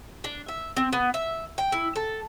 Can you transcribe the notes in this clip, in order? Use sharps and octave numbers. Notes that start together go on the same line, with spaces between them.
D4
E5
C4
B3
E5
G5
E4
A4